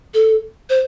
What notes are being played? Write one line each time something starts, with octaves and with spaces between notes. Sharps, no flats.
A4
C5